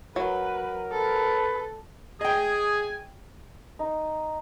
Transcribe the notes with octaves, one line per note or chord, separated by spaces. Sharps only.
F#3 A#4 B4
A4 B4
G#4 D#5 G5 G#5 D#6
D#4